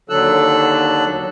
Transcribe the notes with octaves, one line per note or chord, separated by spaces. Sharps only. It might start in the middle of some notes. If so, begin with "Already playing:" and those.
D#2 D3 F#3 A4 E6 F#6